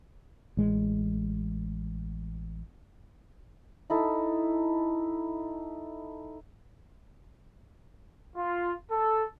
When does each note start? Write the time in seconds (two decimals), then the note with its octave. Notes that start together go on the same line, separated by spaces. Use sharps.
0.57 A1 G#3
3.90 D#4 E4 A4
8.37 F4
8.91 A4